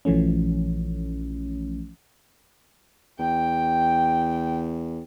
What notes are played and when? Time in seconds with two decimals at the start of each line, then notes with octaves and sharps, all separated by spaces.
0.05 A#1 E3 F3 A3 C#4
3.19 E2 G5